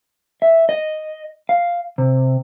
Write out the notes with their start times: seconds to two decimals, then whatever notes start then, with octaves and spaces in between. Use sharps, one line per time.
0.42 E5
0.69 D#5
1.49 F5
1.98 C3